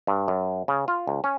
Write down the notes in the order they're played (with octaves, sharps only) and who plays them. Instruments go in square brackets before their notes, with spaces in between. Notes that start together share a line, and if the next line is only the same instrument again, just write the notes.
[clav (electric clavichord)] G2
F#2
C#3
F4
C#2
C#4